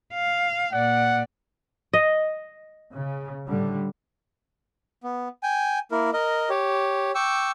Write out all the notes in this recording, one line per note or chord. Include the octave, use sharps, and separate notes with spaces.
F5
A#2 D5 F#5
D#5
C#3
A2 D3 G3
B3
G5 G#5
A#3 E4 A#4
A#4 D#5
G4 C#5
G5 C#6 D6 E6